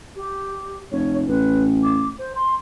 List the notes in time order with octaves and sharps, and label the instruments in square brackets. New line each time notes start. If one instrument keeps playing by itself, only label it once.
[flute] G4
[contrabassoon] F1 [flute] C#5
[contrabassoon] A1 [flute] B4
[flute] D6
C5
C6